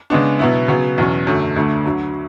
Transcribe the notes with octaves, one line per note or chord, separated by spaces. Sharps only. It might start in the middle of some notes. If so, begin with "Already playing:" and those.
C#3 G#3 B3 D4
B2 F#3 B3 E4
C#3 F#3 B3
E2 B2 F#3 C#4
F#2 D3 A3
D2 D3 A3 D4
D2 D3 F#3